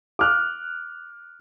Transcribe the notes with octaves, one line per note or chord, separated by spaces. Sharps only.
D6 F6 F#6